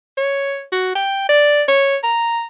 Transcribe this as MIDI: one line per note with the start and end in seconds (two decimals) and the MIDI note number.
0.18 0.63 73
0.72 0.95 66
0.95 1.28 79
1.29 1.63 74
1.68 1.97 73
2.04 2.45 82